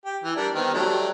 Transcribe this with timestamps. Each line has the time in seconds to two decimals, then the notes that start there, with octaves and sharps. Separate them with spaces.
0.05 G4
0.24 E3
0.36 G3 D4 A#4
0.55 D#3 B3 C4
0.74 F#3 G3 A3